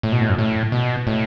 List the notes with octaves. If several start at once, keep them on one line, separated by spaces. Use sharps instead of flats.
A2
B2
A2
F#2
A2
B2
A2